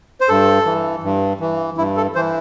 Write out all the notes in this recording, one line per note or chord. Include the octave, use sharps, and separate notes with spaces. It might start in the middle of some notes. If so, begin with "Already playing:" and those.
C5
G2 A4
E3
G2
E3
G2 E4
A4
E3 C5